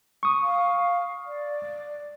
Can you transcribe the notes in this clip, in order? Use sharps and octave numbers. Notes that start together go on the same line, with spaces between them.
C#6 D#6
F5
D5